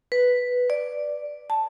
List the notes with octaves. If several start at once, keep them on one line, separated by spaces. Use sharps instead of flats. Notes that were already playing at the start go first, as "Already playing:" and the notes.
B4
D5
A5